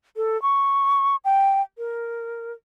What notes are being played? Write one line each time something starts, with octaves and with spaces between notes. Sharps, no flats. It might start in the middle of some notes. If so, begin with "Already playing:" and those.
A4
C#6
G5
A#4